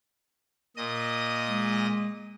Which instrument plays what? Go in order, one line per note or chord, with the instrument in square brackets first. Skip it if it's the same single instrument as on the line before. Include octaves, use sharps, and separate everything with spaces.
[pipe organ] A#2 D#5 D#6
[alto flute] G#3